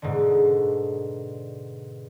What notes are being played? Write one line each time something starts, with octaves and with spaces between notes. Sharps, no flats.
G#2 B2 D3